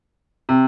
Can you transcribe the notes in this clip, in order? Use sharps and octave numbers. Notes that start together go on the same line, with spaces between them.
C3